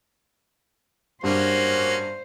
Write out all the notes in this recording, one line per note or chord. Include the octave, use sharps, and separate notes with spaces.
G2 A#3 C#4 F#4 C5